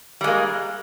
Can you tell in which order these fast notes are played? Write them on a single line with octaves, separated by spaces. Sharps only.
G3 G#3 A#3